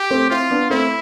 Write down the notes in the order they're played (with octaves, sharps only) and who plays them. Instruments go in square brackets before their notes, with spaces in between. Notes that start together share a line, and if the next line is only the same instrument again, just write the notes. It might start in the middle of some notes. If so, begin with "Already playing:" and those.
Already playing: [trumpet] G4
[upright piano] A3 C4
[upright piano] C4 E4 [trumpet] F4
[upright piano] B3 D4
[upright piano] A3 C4 [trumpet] E4